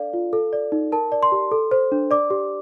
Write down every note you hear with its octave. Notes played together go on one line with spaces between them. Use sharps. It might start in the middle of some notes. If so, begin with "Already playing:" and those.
Already playing: D4 A4 D5 F5
F4
A4
D5
D#4
A#4 A5
D5
C6
G4
A4
C5
D4
D5 D6
G4